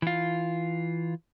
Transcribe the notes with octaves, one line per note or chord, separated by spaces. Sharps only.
E3 F4